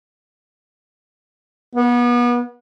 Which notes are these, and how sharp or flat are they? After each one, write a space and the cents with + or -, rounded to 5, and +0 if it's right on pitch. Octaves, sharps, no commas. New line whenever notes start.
B3 -30